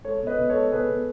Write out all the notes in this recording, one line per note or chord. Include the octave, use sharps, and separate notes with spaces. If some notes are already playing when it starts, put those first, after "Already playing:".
G#3 A4 C#5
B2
B4 D#5
B2
A4 C#5
G#3
B2 G#4 B4
B2